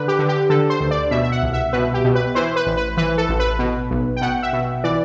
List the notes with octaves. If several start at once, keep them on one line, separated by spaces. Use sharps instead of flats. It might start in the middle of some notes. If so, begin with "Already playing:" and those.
Already playing: D3 B4
G4
D3
G4
D3 A4
C5
D2
D5
B2 E5
E5
F#5
C2
E5
B2 B4
G4
B2
B4
E3 C5
B4
A1
B4
E3 B4
A4
A1
B4
B2
B1
G5
B2 F#5
E5
B2
E3 D5